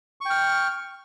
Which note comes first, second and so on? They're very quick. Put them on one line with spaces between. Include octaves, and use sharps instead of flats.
C#6 G5 F6